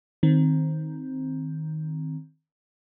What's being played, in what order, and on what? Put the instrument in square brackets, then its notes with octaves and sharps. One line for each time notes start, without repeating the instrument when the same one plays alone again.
[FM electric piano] D#3 C4